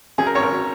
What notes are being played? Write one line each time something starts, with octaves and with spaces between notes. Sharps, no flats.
F#2 G#4
A#4
G#1 C#5
A#4
F#3